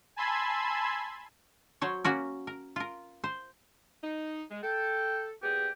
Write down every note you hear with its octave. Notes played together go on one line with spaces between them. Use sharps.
G#5 A5 B5 C6 E6 G#6
F#3 C5 C#5
A#3 C#4 F#4 A#4
A#4
F4 A#4
C5
D#4
G#3
A4 G5
A#2 B3 G4 G#4